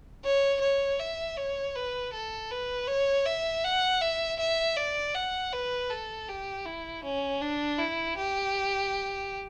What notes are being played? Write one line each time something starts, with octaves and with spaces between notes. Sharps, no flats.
C#5
C#5
E5
C#5
B4
A4
B4
C#5
E5
F#5
E5
E5
D5
F#5
B4
A4
G4
E4
C#4
D4
E4
G4